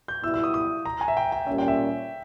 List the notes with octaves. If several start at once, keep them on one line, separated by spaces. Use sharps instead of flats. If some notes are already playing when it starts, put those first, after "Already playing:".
G6
B2 G3 B3 E4 E6
E6
D#6
D#6
A#5
G#5
E5
G5
G5
A#2 G3 C#4 E5
G5
E5